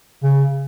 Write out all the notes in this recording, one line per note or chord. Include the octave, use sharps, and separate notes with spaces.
C#3